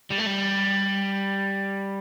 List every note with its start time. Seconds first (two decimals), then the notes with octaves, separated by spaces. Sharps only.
0.10 G3
0.18 A3
0.25 G3